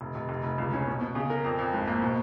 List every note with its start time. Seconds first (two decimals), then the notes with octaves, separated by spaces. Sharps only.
0.01 F1
0.15 F1
0.29 F1
0.43 F1
0.58 C#2
0.73 C#4
0.87 B2
1.01 B2
1.15 C#3
1.30 A#4
1.44 F2
1.59 F2
1.73 G#1
1.88 A#3
2.02 B2